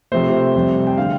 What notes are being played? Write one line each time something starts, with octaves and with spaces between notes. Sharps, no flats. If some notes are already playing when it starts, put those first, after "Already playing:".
C3 F3 A3 C5
F2 C3 G3
G5
D3 A3 F5